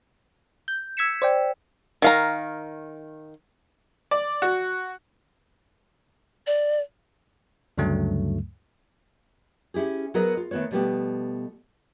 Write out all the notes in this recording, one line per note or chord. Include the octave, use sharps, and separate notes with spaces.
G6
E6 G#6 B6 C#7 E7
C5 D5 G5
D#3 F5 A#5
D5
F#4
D5
D2 G2 C#3 F#3 A3
C#4 E4 G4 G#4
F#3 B3 G#4 A#4 B4 D#5
F4
D#3 A3 B3 B4 C#5
B2 F3 G3 A3 B3 G4